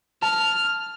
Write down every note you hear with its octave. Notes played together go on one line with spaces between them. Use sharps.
A5 F6